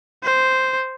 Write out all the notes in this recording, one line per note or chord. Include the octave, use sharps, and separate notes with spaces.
C5